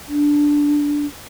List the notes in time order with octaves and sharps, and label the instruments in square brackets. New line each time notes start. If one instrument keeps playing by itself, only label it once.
[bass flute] D4